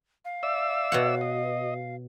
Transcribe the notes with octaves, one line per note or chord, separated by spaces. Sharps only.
F5
D5 E5 E6
B2 C#5 F#5
D#5